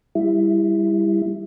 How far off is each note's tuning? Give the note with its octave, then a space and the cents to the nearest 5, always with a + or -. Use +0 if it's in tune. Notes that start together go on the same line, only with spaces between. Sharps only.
G3 +20 E4 +5